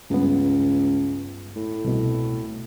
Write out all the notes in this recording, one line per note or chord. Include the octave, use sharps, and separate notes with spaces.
C#2 G2 B3
A2
C2 B2